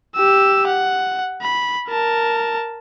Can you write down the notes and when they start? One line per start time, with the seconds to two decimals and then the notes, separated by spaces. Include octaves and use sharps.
0.15 G4 E6
0.67 F#5
1.42 B5
1.89 A#4 A5